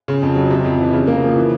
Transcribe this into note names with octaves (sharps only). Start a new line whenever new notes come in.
C#3
F2
F#3
C3
F2
E3
C#3
A#3
F3
E3